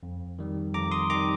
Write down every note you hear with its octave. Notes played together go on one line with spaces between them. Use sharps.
F2
D#3 G3
F2 A#5 D6
C6 D#6
D#3 G3 A#5 D6